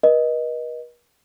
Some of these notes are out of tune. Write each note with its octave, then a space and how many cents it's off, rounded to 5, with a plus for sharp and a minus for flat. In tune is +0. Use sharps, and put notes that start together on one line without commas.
B4 -45 D#5 +0